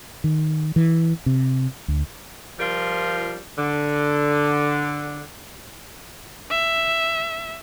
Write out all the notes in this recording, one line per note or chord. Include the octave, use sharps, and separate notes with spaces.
D#3
E3
C3
D2
F3 G3 F4 A#4
D3
E5